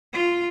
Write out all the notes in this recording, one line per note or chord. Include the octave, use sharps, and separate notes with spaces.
F4